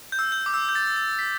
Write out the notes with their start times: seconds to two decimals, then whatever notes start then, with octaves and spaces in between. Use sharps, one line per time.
0.12 G6
0.19 E6
0.32 G6
0.46 D6
0.54 E6
0.69 G6
0.75 A6
0.96 A6
1.19 B6